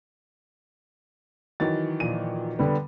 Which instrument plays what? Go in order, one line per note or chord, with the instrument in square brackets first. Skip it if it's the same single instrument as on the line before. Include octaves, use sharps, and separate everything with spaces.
[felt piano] D#3 E3 F#3 [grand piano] A6
[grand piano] A#2 F3 D#7
D3 G3 B3